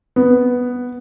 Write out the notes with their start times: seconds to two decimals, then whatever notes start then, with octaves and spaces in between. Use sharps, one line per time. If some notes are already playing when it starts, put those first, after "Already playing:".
0.16 B3